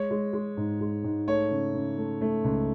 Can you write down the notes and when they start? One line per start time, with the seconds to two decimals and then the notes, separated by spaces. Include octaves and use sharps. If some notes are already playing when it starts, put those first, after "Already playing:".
Already playing: G#3 C#5
0.11 G#3
0.33 G#3
0.57 G#2
0.80 G#3
1.04 G#2
1.27 A3 C#5
1.50 C#3
1.75 C#3
1.98 A3
2.21 A3
2.44 C#2